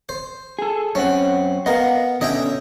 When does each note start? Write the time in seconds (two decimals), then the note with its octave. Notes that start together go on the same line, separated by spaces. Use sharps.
0.09 C5
0.59 G#4 A4
0.95 F#2 C4 C#4 F#5
1.66 B3 A#4 D#5 F5 F#5
2.21 B2 D3 C#4 D#5 E5 G5